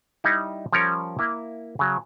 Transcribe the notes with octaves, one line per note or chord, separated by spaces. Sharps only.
G3 D#4 E4
F3 G3 C#4 A#4 C#5
A#3 E4
C#3 F#3